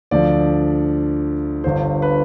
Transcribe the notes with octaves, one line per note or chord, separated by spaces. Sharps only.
D2 D3 F3 D5
G1 G2 D3 C5
B4